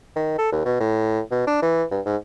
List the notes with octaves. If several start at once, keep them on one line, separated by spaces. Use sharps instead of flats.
D#3
A4
D#2
B2
A2
B2
D4
E3
G2
G#2